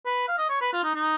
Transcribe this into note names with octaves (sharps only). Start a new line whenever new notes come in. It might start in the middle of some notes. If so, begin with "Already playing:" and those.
B4
F5
D#5
C#5
B4
F4
D#4
D#4